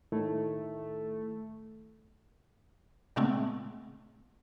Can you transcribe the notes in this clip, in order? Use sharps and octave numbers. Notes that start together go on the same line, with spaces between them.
A2 D#3 A3 E4
A#2 C#3 G#3 A3 B3 C4